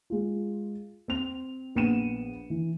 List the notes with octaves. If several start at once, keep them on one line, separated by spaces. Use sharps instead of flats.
G#3 F4
C4 F7
A#1 B3 C#7 D#7 E7
E3